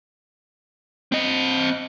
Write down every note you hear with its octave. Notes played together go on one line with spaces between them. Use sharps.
C4 D#5